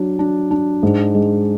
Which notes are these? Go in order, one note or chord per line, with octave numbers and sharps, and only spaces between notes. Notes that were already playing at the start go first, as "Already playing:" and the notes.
Already playing: F#3 D4
D4
D4
G#2
G#3